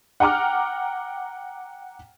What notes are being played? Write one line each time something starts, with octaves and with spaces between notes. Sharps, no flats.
F#5 G5 A#5 D6 F6